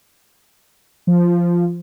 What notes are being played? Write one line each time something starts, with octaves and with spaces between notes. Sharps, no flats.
F3